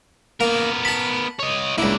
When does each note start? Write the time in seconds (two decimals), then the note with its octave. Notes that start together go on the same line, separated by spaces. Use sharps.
0.41 A#3 B3 A#4
0.85 A5 B5
1.39 C#5 D#5
1.78 C#2 A#3 D4 E4